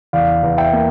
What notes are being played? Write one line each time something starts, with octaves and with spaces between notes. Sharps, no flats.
E2 D5 F5
E2
E5 G5
A#3